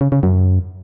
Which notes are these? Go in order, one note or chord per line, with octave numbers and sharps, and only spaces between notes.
C#3
C#3
F#2